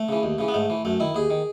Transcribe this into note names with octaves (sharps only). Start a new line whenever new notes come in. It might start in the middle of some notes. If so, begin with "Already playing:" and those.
Already playing: A3
C#3 E3
D#2
C#3 E3
B3
G#2 A3
E3
F#2 A3
D#3 E4
D#2 G#4
D#3